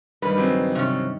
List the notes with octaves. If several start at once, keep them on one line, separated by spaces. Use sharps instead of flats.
G2 D#3 G3 D#4 B4
C#3 F#3 C4 G4
C3 C#4